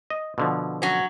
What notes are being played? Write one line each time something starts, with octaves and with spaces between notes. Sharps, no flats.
D#5
B2 D3 F3
F#3 C#4